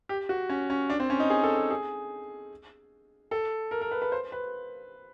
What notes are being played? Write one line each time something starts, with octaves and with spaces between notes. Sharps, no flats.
G4
F#4
C#4
C#4
D4
C4
C#4
D#4
G#4
A4
A4
G#4
A4
A#4
A#4
B4
B4
C5
B4